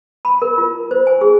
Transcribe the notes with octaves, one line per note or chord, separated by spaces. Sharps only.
B5
A#4
F4
C5
G#5
G#4